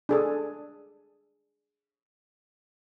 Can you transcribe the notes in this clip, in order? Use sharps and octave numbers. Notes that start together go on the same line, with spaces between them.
D4 G#4 A4